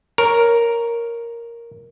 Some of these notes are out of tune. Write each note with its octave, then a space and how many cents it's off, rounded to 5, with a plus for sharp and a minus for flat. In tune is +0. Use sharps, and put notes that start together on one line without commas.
A#4 +0 C#5 +0